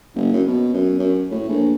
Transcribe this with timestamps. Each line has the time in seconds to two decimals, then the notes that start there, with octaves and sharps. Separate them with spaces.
0.15 F#1
0.33 F#2
0.48 B2
0.73 F#2
0.99 F#2
1.31 A2
1.49 A#1